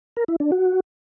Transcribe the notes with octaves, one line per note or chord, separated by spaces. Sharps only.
A#4
E4
D4
F#4